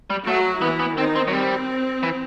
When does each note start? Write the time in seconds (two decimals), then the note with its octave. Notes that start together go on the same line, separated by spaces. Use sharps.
0.10 G3
0.27 F#3 A3 F#4
0.62 E3 B3 E4
0.79 B3
0.97 D#3 C4 D#4
1.16 C4
1.28 F#3
1.32 G3 C4
2.03 E3